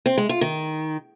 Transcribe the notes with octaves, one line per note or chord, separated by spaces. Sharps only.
C4
G#3
F4
D#3